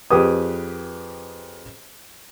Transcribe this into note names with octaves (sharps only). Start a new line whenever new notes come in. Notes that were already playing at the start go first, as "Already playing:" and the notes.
F2 G4 G#4 B4 D#6